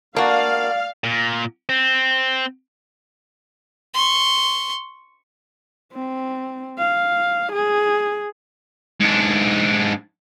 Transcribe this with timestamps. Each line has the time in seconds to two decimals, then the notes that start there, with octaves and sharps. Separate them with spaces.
0.16 A#3 D4 F#4 D5 F5
1.04 A#2
1.69 C4
3.94 C6 C#6
5.93 C4
6.79 F5
7.53 G#4
9.00 G#2 D4